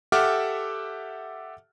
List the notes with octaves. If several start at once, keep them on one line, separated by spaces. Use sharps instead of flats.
G4 A4 E5 F#5 D6 F6